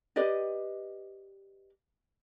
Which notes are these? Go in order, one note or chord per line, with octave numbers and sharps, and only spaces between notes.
G4 B4 D5 D#5